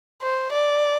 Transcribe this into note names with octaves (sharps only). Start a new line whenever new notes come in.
C5
D5